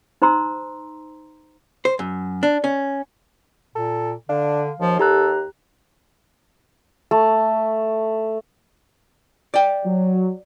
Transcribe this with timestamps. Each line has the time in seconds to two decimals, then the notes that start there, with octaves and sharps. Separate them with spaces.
0.22 D#4 C5 A#5 C6 E6
1.85 C5
1.99 F#2
2.43 D4
2.64 C#4
3.76 A#2 A4
4.29 D3 D4 F5
4.80 D#2 F3
4.99 G4 A4 A#5 F#6
7.11 A3
9.54 D5 G5
9.85 F#3